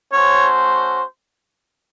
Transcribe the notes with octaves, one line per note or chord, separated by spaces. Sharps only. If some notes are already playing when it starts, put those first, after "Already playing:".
A3 C#4 F#4 C5 C#5